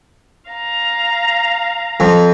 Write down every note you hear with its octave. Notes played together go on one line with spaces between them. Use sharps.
F5 A#5
F2